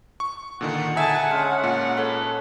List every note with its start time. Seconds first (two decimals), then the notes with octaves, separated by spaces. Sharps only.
0.20 C#6
0.61 A#2 D3 D#3 F#5
0.96 D3 D#4 G#4 E5 G#5 A5
1.31 G#3 C#4 F5
1.64 A#2
1.97 A4 B4 C#5